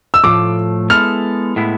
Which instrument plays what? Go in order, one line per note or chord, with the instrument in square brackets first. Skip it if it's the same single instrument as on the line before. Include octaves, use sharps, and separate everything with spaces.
[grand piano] E6
[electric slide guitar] A2 F3 A3 [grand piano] D6
[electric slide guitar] G#3 B3 E4 A4 [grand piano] F6
[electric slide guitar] A2 G#3 B3 E4